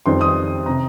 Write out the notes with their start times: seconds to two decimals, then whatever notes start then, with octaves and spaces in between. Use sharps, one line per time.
0.06 F2 D#3 G3 C4 C6
0.21 D#6
0.66 C3 A#5